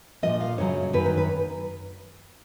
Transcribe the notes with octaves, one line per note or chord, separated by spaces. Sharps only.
A#2 F3 D#5
F5
F#2 C#3 F#3 C#5
F#2 D#3 F#3 B4
D#4
B4